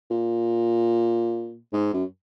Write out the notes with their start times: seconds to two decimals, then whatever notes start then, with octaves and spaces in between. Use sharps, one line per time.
0.10 A#2
1.73 G#2
1.94 F#2